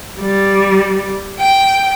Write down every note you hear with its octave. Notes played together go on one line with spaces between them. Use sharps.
G3
G5